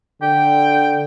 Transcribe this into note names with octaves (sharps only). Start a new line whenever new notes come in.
D3 G5